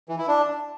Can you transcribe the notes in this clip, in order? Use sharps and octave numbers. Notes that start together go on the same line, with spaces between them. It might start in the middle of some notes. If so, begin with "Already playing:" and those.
E3
E4
D4